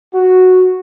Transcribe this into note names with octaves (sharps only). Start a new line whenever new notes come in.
F#4